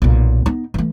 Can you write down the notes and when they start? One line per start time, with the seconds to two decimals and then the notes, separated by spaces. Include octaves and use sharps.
0.02 B1 A#2
0.46 B3 D#4
0.74 E3 A3